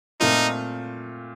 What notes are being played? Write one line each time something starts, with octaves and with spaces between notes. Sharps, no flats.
A#2 A3 C4 D#4 F4